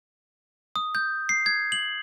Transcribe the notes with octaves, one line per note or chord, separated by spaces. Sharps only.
D#6
G6
C7
G#6
F#7